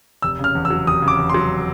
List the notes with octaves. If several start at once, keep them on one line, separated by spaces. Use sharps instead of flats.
F1 E6
C#3 F6
E2
E6
F#3
F1 D#6
C#3
D6
E2
F#3 C6